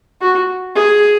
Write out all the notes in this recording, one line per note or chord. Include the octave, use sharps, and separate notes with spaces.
F#4
G#4